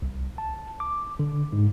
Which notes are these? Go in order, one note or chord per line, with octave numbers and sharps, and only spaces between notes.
C2
A5
D6
D3
G#2